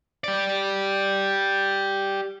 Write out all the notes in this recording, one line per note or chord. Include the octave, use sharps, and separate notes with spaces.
G4 D5